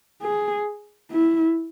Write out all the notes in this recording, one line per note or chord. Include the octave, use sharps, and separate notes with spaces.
G#4
E4